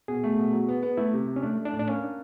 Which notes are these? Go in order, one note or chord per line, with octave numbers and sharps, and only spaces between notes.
B2 G#4
A3
B2
F#3
B3
B3
A3 E4
C3
C3
C#4
A3 D4
A3
D4
A2
D4
A#3 C#4
D4